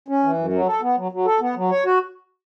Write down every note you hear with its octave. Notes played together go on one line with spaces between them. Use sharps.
C#4
E3
F#2
F#3
A4
B3
F#3
F#3
A4
B3
F#3
C#5
F#4